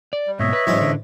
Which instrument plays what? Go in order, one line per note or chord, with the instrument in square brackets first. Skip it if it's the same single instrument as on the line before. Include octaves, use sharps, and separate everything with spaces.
[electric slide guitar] D5
[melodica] G3
[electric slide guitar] G#2 B2 [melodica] C#5 D#5 E5
[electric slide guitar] B4
[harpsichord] A1 G#2 C#4 [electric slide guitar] F#3
[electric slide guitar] D3